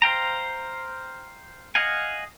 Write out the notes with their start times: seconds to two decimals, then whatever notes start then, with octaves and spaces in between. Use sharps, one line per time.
0.02 C5 F5 G5 A#5
1.75 D#5 F5 F#5 G#5